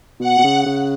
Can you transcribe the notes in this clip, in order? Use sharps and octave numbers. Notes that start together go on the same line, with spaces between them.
B2 F#5
B2
C#3
C#3